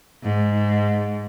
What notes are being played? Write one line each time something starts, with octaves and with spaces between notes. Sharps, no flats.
G#2